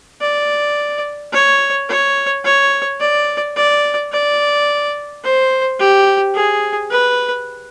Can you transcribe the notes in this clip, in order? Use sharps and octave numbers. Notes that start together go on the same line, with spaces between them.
D5
C#5
C#5
C#5
D5
D5
D5
C5
G4
G#4
B4